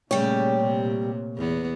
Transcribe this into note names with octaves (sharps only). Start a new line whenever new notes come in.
A#2 C#3 G3 A3 G4 C#5
C3
E2 B3